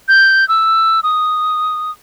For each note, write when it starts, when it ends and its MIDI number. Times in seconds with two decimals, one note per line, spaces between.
0.08 0.47 91
0.48 1.00 88
1.03 1.91 87